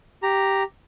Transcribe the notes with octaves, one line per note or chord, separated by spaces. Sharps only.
G4 A#5